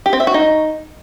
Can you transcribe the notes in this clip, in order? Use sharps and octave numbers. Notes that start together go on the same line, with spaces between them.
G4
C4
E5
F#4
D#4